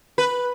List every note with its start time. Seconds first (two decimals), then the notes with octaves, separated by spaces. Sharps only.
0.18 B4